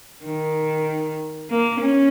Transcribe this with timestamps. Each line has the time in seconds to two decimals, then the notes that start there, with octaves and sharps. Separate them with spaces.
0.24 D#3
1.50 A#3
1.80 C#4